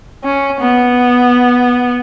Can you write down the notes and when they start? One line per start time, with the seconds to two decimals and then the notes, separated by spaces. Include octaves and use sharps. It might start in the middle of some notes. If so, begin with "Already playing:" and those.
0.24 C#4
0.61 B3